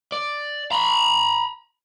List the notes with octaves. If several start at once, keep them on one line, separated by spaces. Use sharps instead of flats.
D5
A#5 B5